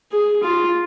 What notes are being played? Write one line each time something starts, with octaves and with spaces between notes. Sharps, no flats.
G#4
F4